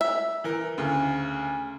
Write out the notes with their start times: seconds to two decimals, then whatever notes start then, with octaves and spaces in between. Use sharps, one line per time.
0.01 E5
0.44 E3 A#4
0.78 D2 C#3